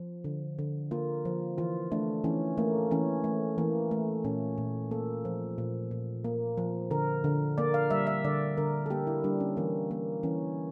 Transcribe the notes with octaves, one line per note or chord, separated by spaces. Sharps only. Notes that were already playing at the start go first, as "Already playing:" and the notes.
Already playing: F3
D3
D3
A#3 F4
F3
E3 F4
A3 D4
E3 C#4
A3 A#3
E3 C#4
A3
E3 A#3
A3
A#2 C#4
A#2
A#3 A4
F3
A#2
A#2
A#3
F3
D3 A#4
D3
A#3 D5
F5
G3 E5
E5
D3 D5
D3 A#4
A4
A#3 G4
E4
G3 D4
C#4
E3 A#3
A#3
E3 C#4